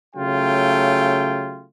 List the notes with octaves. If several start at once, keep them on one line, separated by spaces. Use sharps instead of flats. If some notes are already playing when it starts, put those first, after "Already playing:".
C#3 F#3 A3 F4 G5